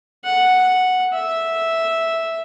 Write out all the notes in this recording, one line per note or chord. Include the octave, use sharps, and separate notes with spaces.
F#5
E5